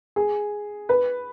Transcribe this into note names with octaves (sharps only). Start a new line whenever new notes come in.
G#4
B4